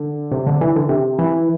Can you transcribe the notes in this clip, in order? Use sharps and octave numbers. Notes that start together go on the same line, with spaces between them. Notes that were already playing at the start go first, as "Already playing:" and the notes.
Already playing: D3
C3
D3
E3
D3
C3
E3